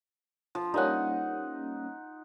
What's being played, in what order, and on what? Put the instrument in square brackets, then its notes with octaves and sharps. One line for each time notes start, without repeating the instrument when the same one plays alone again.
[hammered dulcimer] F3
[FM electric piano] G3 A#3 C#4 [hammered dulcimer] D#4 F#5